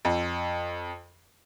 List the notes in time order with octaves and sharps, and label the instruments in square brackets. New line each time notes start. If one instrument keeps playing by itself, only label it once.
[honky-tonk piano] F2